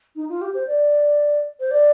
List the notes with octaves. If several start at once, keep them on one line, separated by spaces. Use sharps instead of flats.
D#4
F4
G4
C5
D5
C5
D5